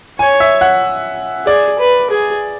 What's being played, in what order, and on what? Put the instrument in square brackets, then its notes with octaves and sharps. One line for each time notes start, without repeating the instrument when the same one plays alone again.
[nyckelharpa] C#5 [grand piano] G#5
[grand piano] E5
F#5
[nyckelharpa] G#4 [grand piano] D5
[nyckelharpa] B4
G#4